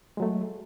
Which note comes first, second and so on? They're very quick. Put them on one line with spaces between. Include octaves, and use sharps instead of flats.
G#3 F#3 A3